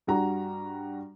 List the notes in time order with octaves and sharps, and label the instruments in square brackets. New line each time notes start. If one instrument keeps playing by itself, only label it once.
[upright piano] G2 G3 F#4 A#5